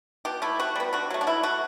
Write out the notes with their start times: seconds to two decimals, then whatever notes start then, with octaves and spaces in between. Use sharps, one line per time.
0.25 B2 G4
0.42 A3 E4
0.59 C3 F#4
0.76 G3 B3
0.93 D3 F#4
1.10 F#3 A3
1.21 D4
1.27 B2 E4
1.43 A3 F#4